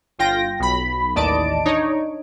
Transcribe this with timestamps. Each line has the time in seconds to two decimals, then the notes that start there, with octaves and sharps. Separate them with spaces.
0.19 G1 F4 G5 A#6
0.60 B1 B5
1.15 A1 D#2 D5 D#5 A5 D7
1.65 D4 D#4 C#5